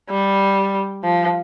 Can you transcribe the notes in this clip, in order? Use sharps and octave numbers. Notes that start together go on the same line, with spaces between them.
G3
F3